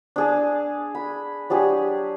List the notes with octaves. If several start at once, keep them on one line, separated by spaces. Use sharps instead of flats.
D4 G#4 A5
B5
F#3 D4 G4 G#4